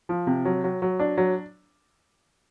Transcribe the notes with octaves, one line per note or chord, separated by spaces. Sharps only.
F3
C3
F#3
F#3
F#3
D4
F#3